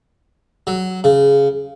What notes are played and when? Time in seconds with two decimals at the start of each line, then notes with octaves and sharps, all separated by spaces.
0.67 F#3
1.04 C#3